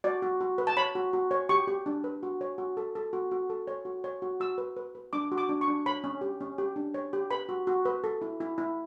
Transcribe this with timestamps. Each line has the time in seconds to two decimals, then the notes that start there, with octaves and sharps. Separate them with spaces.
0.04 F#4 D5
0.22 F#4
0.41 F#4
0.58 B4
0.67 A5
0.77 C#5 B5
0.95 F#4
1.13 F#4
1.31 C#5
1.49 G4 C#6
1.68 G4
1.86 D4
2.04 B4
2.23 F#4
2.41 C#5
2.58 F#4
2.77 A4
2.95 A4
3.13 F#4
3.31 F#4
3.50 A4
3.67 C#5
3.85 F#4
4.04 C#5
4.22 F#4
4.40 F#4 E6
4.58 B4
4.77 B4
4.95 B4
5.13 D4 D6
5.32 F#4
5.38 D6
5.49 D4
5.61 C#6
5.68 D4
5.86 C#5 B5
6.04 C#4
6.21 G4
6.41 C#4
6.58 G4
6.76 D4
6.94 C#5
7.13 G4
7.31 B4 B5
7.49 F#4
7.67 F#4
7.85 B4
8.04 A4
8.22 E4
8.40 E4
8.58 E4